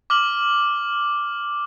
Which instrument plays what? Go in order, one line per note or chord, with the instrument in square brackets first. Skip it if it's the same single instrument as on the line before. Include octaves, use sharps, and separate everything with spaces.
[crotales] D6 F6 F#7